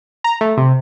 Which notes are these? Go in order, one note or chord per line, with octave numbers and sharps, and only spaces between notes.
A#5
A3
C3